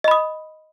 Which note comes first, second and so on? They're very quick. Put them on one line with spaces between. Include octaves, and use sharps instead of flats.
D#5 B5 D#6